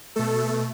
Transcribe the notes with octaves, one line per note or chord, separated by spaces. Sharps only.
B2 A3 A4